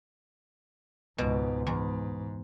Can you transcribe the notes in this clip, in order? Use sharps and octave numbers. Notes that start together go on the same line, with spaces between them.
C#2 G#2 B2
E2 G#2